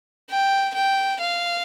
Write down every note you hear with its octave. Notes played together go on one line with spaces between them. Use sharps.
G5
G5
F5